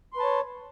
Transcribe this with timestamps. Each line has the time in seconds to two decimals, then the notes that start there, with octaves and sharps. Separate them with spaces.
0.13 C6
0.16 B4
0.20 A5
0.23 C#5